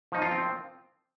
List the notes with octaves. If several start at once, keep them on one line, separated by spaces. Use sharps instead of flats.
F3 D#4
F4
C4